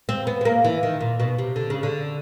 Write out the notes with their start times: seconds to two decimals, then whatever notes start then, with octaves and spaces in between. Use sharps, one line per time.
0.09 C4
0.27 B3
0.41 B3
0.45 A#3
0.64 E3
0.83 D#3
1.01 A#2
1.20 B2
1.38 C3
1.56 D3
1.70 C#3
1.83 D3